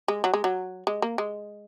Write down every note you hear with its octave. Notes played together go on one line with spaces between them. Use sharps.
G#3
F#3
G#3
F#3
G#3
A#3
G#3